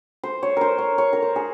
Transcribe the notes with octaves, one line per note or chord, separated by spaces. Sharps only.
C5
C#5
A#4 C5
C#5
C#5
A#4
C5
G#4